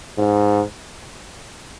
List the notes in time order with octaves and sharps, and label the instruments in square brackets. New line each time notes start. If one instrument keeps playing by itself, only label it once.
[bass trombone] G#2